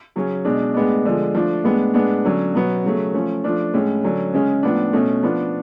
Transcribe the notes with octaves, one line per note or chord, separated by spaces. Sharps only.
C#3 F#3 C#4
B2 G#3 D4
A2 G#3 B3 D4
D3 F3 G#3
F3 A3 D4
A2 G#3 B3 D4
A2 G#3 B3 D4
D3 F#3 C#4
B2 F#3 B3
C#3 F#3 A3
F3 A3 C#4
F3 A3 D4
A2 G#3 C#4
D3 F#3 C#4
C#3 G#3 C#4
A2 F3 B3 D4
B2 A3 C#4
F3 B3 D4